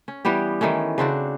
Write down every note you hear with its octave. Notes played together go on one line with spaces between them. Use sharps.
C#4
E3 G3 B3 G4
D#3 E3 A3 C#4
C#3 C4 D4 F#4